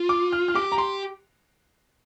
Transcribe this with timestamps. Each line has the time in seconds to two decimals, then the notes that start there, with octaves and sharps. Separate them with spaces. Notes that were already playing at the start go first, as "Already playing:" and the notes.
Already playing: F4
0.09 D6
0.32 F6
0.48 F6
0.55 G4 D6
0.72 A#5
0.78 G4 C6